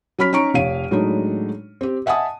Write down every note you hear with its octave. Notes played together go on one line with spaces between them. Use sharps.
F#3 C#4 B5 F6 B6
C#4 D#4 A#5 C#6 D7
F1 C#5 F5 D#7
A2 F#3 G#3 D4 D#4
C4 G4
D#5 E5 F#5 G#5 A5 D#6